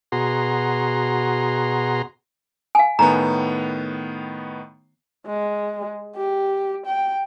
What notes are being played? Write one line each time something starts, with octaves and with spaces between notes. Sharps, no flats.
B2 F#4 G#4 A#5 C6
F5 G#5
A2 D#3 B3 A#5
G#3
G4
G5